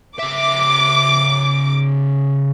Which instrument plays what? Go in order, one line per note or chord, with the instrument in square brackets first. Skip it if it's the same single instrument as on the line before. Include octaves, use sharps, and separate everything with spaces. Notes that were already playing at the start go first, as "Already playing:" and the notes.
[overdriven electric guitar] C#3 E5 [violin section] D6